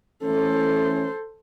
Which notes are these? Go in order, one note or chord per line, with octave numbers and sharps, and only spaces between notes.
E3 A3 C#4 A4 C5